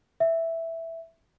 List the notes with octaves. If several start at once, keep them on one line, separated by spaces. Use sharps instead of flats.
E5